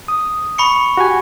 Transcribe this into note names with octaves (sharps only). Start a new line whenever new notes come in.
D#6
B5 C#6 C#7
F#4 G4 G#5